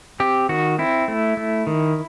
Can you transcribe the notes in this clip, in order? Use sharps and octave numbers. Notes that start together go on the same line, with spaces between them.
C4 G4
D#3 F#4
C4 E4
A3
A3
D#3